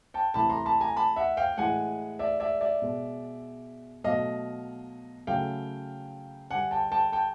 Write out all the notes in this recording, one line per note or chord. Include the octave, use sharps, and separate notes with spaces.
G5 A5
C3 E3 A3 A5 B5
A#5 C6
A5 B5
G#5 A#5
A5 B5
E5 F#5
F5 G5
A2 E3 G#3 F#5 G#5
D5 E5
D5 E5
D5 E5
B2 G#3
B2 F#3 A3 D#5 F5
C#3 F#3 A3 F5 G5
D3 G3 F#5 G#5
G5 A5
G5 A5
G5 A5